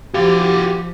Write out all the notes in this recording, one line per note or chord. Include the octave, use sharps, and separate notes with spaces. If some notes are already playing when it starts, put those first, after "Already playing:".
F3 F#4 G4 F5